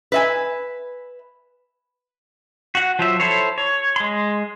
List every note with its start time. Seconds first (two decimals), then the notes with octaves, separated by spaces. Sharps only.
0.12 B4 E5 G#5
2.75 F#4 F#5
2.99 F3 F#3 E5
3.20 E4 A4 C5 C#5
3.58 C#5
3.96 G#3 C6